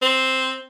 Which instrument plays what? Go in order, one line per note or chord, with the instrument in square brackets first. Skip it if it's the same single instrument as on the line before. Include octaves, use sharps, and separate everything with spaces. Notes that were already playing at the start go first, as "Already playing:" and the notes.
[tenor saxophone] C4